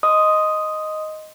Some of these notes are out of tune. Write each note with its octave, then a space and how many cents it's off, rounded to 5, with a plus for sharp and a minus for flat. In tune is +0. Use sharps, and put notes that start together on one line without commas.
D#5 +0 C6 +0 D#6 +0